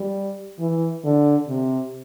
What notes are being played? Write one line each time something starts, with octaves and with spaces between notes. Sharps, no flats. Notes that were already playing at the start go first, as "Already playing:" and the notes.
Already playing: G3
E3
D3
C3